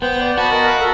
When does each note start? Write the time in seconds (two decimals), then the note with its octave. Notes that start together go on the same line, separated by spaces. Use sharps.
0.02 B3 C5 G5
0.21 D5
0.38 B3 F#4 B4 A5
0.51 A#4 D#5 A5
0.66 F5 B5
0.80 A4 A#4 A#5